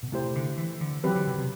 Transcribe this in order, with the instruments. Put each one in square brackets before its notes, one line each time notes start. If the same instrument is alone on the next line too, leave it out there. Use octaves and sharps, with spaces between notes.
[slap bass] B2
[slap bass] C3 [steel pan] A3 E4 G4 C5
[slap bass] D3
E3
D3
[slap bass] E3 [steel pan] F#3 C4 G4 B4
[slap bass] D3
C3
C3